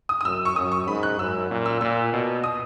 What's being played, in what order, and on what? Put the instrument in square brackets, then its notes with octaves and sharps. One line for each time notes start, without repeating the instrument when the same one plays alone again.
[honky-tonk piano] D#6
D#6
[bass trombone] F#2 [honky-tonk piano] E6
[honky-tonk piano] C#6
[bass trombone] F#2 [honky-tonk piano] D#6
[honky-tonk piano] C#6
[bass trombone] G#2 [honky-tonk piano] B5
[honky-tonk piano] F#6
[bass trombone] F#2 [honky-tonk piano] E6
[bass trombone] A#2
[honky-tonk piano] E6
[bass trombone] A#2 [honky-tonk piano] E6
[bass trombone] B2
[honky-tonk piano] D#6